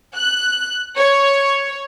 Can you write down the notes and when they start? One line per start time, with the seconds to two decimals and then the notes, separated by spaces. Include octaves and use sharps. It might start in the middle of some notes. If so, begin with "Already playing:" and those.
0.16 F#6
0.97 C#5